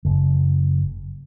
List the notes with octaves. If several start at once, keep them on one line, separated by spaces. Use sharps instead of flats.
F#1